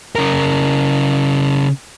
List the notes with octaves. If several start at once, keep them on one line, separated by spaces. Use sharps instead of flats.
C#3 A#4